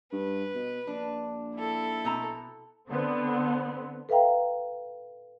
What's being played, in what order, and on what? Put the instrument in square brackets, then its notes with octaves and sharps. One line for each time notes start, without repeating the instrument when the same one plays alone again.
[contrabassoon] G2 [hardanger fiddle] B4
[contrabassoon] B2
[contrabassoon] A#1 [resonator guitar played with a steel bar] D4
[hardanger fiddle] E4 A4
[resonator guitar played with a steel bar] B2 C4 A#5
[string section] D3 B3 C4
[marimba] A4 B4 E5 F5 G5 A#5